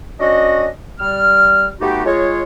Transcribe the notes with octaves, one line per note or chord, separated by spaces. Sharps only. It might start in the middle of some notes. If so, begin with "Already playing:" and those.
C#4 D4 F#4 D#5
G3 F6
A3 B3 D#4 F#4 G4
G#3 F4 C#5